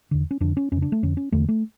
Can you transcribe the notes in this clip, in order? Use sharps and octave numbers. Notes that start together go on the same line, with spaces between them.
E2 D3
C#4
F2 D3 D4
C#4
F2 C#3 C#4
D4
A3
F2 D3 C#4
C#4
E2 D3 A3
A3